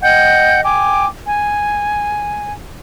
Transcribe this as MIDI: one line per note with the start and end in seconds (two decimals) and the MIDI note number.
0.02 0.60 75
0.02 0.60 78
0.02 0.60 79
0.02 0.60 91
0.63 1.05 79
0.63 1.05 80
0.63 1.05 86
1.25 2.53 80